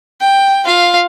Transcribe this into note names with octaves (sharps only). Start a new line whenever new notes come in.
G5
F4 F5